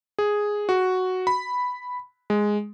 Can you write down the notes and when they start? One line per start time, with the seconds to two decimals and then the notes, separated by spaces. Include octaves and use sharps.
0.19 G#4
0.69 F#4
1.27 B5
2.30 G#3